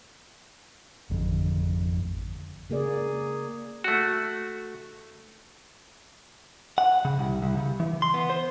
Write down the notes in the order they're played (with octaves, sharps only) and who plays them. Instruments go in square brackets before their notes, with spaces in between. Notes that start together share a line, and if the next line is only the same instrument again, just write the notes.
[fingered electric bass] G#1 F2 D3
[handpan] C#3 A#3 G#4 D5
[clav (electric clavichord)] A3 F#4
[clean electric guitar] F#5
C#3
C2
C2
C#3
E3
C6
B3
C5